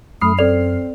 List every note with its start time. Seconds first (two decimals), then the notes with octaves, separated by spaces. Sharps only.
0.21 F#2 A3 B5 D#6 F6 C7
0.39 C4 A4 D5 F7